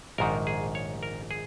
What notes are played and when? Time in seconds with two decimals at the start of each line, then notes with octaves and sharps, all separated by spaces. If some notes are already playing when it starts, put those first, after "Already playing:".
0.18 A#1 G#2 D#3 A#4
0.47 G#4
0.75 C#5
1.03 A#4
1.31 G#4